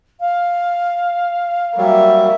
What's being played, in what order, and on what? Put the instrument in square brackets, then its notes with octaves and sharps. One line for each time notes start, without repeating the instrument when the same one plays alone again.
[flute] F5
[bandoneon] F#3 G3 [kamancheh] A#3 E5